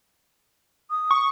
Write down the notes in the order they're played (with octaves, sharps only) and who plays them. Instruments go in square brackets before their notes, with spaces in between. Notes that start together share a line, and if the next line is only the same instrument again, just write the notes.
[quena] D#6
[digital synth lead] C#6